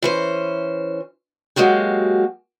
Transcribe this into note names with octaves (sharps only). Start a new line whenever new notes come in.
E3 C#4 C5
F#3 G#3 A#3 F#4 G4